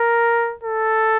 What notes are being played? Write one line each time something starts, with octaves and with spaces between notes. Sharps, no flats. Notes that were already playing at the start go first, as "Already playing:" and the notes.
Already playing: A#4
A4